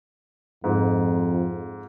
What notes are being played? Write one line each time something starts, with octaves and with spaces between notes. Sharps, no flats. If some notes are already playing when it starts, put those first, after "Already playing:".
F2 G#2